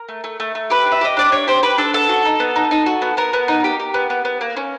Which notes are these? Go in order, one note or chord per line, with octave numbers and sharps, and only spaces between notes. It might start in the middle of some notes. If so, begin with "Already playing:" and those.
Already playing: A#4
A3
A3
A3
A3
G4 B4
D4
E5
G4 D#5
D4 D5
D4 C#5
G4 C5
G4 B4
D4 A4
B3 A4
F#4
D#4
B3
D#4
D#4
F#4
B3
B3 A#4
B3
D#4
G4
G4
B3
B3
B3
A#3
C#4